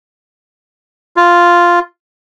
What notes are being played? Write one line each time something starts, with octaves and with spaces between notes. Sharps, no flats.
F4